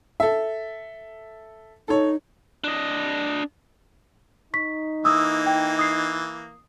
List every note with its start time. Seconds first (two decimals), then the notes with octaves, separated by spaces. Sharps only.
0.20 A4 E5
1.88 D#4 A4 C#5
2.64 D4 D#5
4.54 D#4 C#6 B6
5.05 E3 A#3 D#6 E6
5.46 G5
5.79 D#6 C7